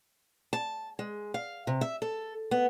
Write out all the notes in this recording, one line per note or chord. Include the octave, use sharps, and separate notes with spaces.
A5
G#3
F5
C3
E5
A4
B3